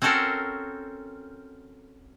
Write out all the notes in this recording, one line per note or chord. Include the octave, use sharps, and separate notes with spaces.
C4 C#4 F#4 A4 A#4 C5